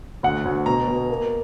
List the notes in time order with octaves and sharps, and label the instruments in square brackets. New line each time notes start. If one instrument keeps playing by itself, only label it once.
[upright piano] D2 [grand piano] F#5
[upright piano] D2
[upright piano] B2 [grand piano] A#5
[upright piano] B2
A#3